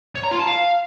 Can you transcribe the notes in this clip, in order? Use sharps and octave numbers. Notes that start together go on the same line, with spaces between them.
C#5
A#5
F4
A5
F5